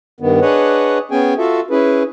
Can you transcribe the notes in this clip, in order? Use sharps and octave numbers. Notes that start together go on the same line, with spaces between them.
G2 D#3 B3
D4 G#4 B4 C#5 D#5 F#5
B3 C#4 G#4 G5 G#5
F4 F#4 A4 E5
C#4 E4 G#4 B4